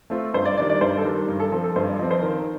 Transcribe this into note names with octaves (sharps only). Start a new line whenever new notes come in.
A3 C4 F4
G2 C5
D5
D#3 G3 D4 D5
D5
G2 C5
A4
D#3 G3 D4 A#4
G2 A#4
A4
F3 C4 A4
A4
G2 C5
D5
F3 C4 D#5
C5
D#3 A#4